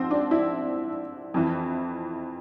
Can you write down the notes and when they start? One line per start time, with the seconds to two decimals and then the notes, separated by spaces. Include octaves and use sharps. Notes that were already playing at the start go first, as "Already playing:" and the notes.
Already playing: G#2 F3 C4
0.11 D4
0.31 E4
1.34 F2 E3